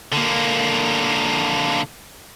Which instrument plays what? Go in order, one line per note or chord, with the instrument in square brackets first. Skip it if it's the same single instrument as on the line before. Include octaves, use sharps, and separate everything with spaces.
[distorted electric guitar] D3 A#3